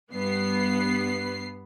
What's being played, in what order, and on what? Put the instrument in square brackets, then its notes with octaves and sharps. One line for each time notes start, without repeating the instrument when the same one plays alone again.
[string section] G2 B3 C7